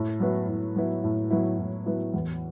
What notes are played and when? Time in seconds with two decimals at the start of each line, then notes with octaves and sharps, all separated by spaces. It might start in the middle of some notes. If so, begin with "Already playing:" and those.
Already playing: A2
0.20 F#3 B3 E4
0.48 A2
0.76 F#3 B3 E4
1.04 A2
1.31 F#3 B3 E4
1.59 A2
1.86 F#3 B3 E4
2.14 E2